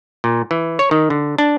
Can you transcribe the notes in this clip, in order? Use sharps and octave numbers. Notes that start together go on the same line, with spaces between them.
A#2
E3
C#5
D#3
D3
D4